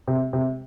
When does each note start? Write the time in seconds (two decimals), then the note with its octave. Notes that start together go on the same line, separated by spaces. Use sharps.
0.08 C3
0.33 C3